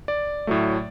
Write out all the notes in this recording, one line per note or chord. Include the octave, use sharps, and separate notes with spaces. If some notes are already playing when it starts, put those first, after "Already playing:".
D5
A2 F#3 A3